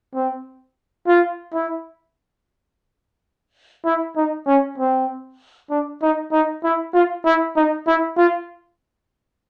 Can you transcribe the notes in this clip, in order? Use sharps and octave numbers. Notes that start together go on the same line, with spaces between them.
C4
F4
E4
E4
D#4
C#4
C4
D4
D#4
D#4
E4
F4
E4
D#4
E4
F4